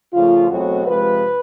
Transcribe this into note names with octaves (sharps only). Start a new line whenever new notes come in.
C#3 F3 A3 F4
E2 B2 F#3 A3 C4 F#4
C3 F3 G#3 B4